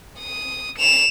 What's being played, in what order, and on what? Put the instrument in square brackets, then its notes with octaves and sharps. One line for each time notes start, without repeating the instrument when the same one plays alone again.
[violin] D#6
E7 F7